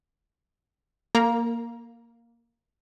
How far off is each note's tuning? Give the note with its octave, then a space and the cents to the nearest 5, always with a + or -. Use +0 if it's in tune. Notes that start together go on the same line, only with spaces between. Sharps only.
A#3 +0 A#4 -35 A#5 +20